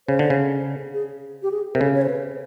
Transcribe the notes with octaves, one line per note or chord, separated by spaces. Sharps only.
C#3 C5
D3
C#3
G#4
G4
G#4
C3 A#4
C#3 A4
C#5
C5
B4